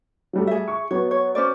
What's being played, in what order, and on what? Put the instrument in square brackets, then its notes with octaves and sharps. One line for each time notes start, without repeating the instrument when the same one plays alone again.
[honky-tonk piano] F#3 G3 A3
[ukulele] G#4 E5
[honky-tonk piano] C#6
[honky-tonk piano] F#3 B3 [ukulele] C#5
[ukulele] C#5
C#4 C5 D5